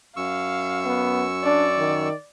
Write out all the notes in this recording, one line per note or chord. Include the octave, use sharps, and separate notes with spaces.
F#2 F5 C#6 E6
B3
D4 D5
D#3